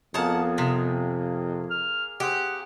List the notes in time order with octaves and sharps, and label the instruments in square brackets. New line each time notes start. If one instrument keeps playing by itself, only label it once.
[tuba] F2 [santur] A#3 G#4 [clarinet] B3 [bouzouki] F#5 A5
[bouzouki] C3
[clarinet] F6
[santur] C4 G#4 [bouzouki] G4 [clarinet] F#5